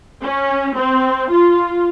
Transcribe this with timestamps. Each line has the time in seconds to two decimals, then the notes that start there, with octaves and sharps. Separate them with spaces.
0.23 C#4
0.76 C4
1.31 F4